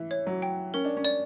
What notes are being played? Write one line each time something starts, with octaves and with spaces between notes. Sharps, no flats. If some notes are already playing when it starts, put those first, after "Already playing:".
Already playing: E3 E5
C#5
F#3
G5
C#4 A#4
D4
C#4
D5